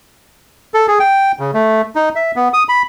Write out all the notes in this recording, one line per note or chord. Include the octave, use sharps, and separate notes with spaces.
A4
G#4
G5
C#3
A3
D#4
E5
B3
D#6
B5